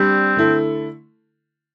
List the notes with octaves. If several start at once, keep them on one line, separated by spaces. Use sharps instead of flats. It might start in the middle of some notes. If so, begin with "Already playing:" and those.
Already playing: G3 C4 D4 G4
D3 A3 E4 A4